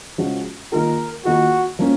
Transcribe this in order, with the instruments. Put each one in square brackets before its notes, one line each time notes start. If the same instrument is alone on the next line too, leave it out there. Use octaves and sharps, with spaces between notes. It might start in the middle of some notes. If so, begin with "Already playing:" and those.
[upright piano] C#3 F3 G#3 C#4 F#4
[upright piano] D#3 A#3 F4 G#4 [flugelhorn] A#4
[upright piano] D#3 A#3 F4 G#4 [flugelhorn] F#4
[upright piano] F3 A#3 C#4